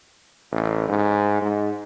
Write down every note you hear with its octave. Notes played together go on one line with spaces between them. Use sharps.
A1
G#2
G#2